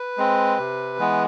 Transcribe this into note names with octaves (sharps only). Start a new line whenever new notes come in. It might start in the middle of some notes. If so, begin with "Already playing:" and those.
Already playing: B4
G#3 C4
C3
E3 G#3 B3